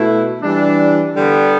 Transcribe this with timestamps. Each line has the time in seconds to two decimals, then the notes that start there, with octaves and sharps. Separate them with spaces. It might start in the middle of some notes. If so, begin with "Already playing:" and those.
Already playing: B2 A3 E4
0.40 E3 G3 D4
1.15 D3 G3 B3